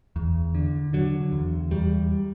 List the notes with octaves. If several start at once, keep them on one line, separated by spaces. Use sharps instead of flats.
E2
D3
D3 F#3
E2
E2 G3